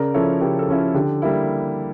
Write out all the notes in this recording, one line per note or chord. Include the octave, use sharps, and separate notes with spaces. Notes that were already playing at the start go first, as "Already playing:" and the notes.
Already playing: C#3 A#4 D5
F3 C#4 E4 A4 C#5
C#3 G4 A#4
A4
F3 C#4 E4
D3 G4
G3 A#3 E4